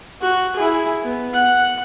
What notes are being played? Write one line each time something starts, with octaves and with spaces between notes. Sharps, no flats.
F#4
E4 G#4
B3
F#5